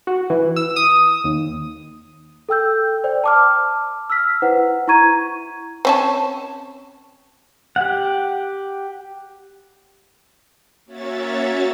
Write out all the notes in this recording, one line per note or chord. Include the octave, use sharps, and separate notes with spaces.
F#4
E3
E6
D#6
D#2
A4 G5 E6 G6
C5 D5 G5
A5 D6 F6
E6 F6 B6
E4 B4 C5 F#5
E4 A#5 C#6 G#6 D#7
C4 C#4 A5
G4 F#5
A#3 C#4 F#4 C#5 E5 A6